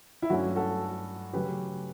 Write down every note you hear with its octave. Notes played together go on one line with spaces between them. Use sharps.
E4
G2 F#3 A3 C#4 F#4
F#4 A4
C#3 F#3 A3 C#4 G4 B4